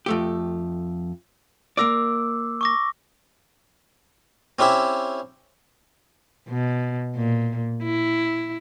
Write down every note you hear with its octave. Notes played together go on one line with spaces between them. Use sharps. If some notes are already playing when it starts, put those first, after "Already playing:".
F2 A3 G4
A#3 A#4 D5 D6 E6
C#6 D6 A#6
C4 C#4 E4 G4 E5
B2
A#2
E4